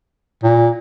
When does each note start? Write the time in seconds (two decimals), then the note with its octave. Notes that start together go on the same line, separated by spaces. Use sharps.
0.44 A#2